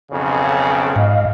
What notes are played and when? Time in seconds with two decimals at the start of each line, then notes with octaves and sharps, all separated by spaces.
0.12 B1 F2 C#3
0.96 G#2 D#5 F5